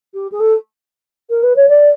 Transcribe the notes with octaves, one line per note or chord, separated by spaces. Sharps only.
G4
G#4
A4
A#4
B4
C#5
D5